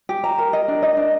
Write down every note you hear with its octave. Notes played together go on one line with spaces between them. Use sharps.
G4
A#5
A#4
D#5
D4
D#5
D4